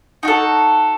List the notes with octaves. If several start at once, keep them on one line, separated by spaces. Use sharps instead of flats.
D#4 F#4 A4